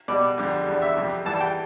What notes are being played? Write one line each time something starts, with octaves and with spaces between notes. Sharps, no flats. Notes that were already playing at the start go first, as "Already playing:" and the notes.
B2 G3 D5
F2 D3 G3
E2 D3 G3
E5
F2 C3 G3
G2 E3 G3 A5
G5